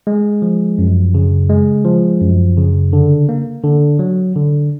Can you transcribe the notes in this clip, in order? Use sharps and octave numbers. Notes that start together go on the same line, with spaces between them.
G#3
F3
F#2
C#3
G#3
F3
F#2
C#3
D3
A#3
D3
F#3
D3